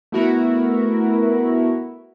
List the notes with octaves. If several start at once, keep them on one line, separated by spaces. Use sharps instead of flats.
A3 B3 E4 F#4 A#4